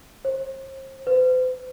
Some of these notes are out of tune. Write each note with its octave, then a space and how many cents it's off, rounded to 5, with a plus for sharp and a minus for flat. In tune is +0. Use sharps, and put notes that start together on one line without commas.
C5 +35
C5 -45